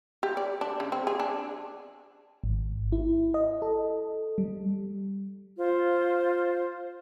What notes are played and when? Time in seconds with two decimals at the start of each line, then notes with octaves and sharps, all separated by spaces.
0.23 G4
0.37 D5
0.61 D4
0.80 C#3
0.92 C4
1.07 G#4
1.20 D4
2.44 G#1
2.92 E4
3.34 D#5
3.62 A4
4.38 G3
5.57 F4 C5